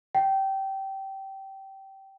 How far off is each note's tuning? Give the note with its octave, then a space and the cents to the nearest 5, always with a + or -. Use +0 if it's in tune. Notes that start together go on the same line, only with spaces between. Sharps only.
G5 -20